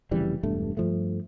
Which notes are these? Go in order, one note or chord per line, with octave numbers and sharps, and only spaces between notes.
F1 C#3 E3 G3
E1 G2 A3
G2 F3 A3